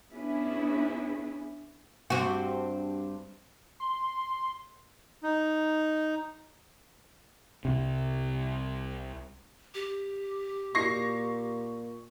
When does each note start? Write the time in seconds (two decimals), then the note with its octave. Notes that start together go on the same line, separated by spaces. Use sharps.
0.12 B3 C#4 D4 E4 G#4 B4
2.10 G2 C4 F#4
3.80 C6
5.23 D#4
7.65 C2 C3
9.75 G4
10.75 A#2 C#6 A#6 C7